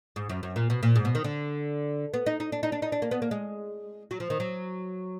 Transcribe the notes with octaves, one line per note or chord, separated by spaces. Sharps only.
G#2
F#2
F#2
A#2
B2
A#2
G#2
B2
D#3
D3
B3
D#4
D#4
D4
D#4
D4
D#4
D4
A#3
B3
A#3
G#3
F#3
F3
D#3
F#3